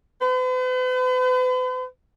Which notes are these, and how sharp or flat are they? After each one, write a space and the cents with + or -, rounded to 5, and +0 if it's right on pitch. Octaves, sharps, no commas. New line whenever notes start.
B4 +45